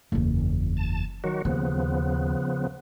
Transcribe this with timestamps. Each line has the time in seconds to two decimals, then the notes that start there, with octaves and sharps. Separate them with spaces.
0.12 F#1 E2
0.77 A5
1.24 D#3 F#3 F#4
1.45 D#2 C#3 F3 B3